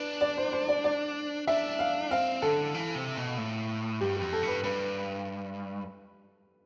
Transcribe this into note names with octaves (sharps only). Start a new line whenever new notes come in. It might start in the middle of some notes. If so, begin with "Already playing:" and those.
Already playing: D4 B4
D5
C5
C5
D5
D5
D4 E5
F5
C4 F5
D3 A4
E3
C3
B2
A2
G2 G4
F2 G4
A4
G2 B4
G2 B4